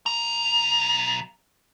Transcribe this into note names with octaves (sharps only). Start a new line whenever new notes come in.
B1 A#5